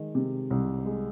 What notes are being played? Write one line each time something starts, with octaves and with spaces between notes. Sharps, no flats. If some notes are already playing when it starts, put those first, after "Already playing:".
Already playing: D#3 G#3
C3
C2
G#3